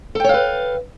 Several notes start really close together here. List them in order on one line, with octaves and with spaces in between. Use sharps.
A4 G5 C#5 F5 B4